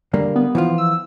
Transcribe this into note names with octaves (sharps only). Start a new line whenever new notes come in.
D3 G3 A#3
B3
E3 F3 F4
E6